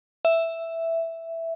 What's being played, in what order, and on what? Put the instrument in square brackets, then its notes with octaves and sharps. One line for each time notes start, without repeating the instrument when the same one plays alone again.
[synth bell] E5